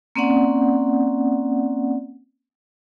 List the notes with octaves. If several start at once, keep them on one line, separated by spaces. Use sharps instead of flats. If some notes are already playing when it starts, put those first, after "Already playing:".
A#3 C4 C#4 D5 F#5